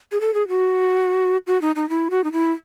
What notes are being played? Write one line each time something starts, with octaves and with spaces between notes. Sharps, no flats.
G#4
A4
G#4
F#4
F#4
D#4
D#4
E4
F#4
D#4
E4